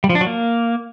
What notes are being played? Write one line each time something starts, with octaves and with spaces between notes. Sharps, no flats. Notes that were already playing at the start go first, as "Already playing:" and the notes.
G3
F3
D4
F#3
A#3